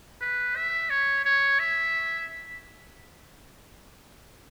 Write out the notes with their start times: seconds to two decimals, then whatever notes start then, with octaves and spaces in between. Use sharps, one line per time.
0.21 B4
0.56 E5
0.90 C#5
1.25 C#5
1.59 E5